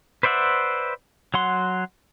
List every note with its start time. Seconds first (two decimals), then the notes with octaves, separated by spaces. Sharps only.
0.23 B4 C5 D5 E5 F#5
1.34 F#3 F#5 C6